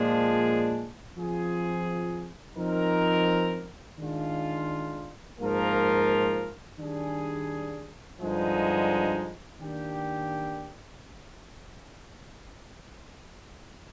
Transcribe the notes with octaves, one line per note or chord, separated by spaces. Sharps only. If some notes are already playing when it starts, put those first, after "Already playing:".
Already playing: A#2 F3 G#3 D4 G#4
F3 C4 F4 G#4
F3 C4 D#4 A#4
D#3 G#3 D4 F4
G#2 F3 A#3 F4 A#4
D#3 G3 D4 G#4
G2 D3 F3 G#3 D#4
D#3 A#3 D4 G4